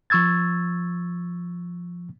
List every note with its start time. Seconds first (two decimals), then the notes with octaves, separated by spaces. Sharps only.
0.10 F3 C#6 E6 G#6 A6